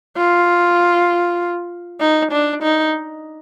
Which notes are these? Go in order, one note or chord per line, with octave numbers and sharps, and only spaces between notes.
F4
D#4
D4
D#4